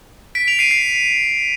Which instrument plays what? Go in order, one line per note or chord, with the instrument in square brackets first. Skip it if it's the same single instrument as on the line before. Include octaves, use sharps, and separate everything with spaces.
[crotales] B6 D7
D7 F7
C7 D#7
C7 D#7